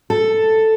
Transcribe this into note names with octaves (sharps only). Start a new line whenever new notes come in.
A4